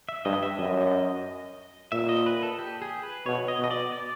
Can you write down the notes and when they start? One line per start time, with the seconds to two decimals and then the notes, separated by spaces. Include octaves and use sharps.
0.09 E5
0.25 G2 D#5
0.43 E5
0.59 F#2 D#5
1.92 A#2 E5
2.09 D#5
2.26 B4
2.43 A4
2.59 G4
2.82 G#4
3.03 B4
3.26 B2 C#5
3.48 D#5
3.59 B2 D#5
3.71 D5
3.92 D5